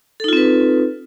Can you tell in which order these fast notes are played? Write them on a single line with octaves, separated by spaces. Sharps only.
A4 D#4 F4 C4 B4